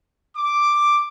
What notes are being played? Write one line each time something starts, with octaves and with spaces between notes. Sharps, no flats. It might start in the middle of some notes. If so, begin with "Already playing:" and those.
D6